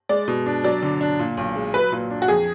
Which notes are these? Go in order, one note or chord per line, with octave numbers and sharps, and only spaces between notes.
G#3 D5
B2
D4
F#3 D5
D3
D4
A#2
B1
G#3
F#3 B4
A#2
D4
F#4
F2 G#4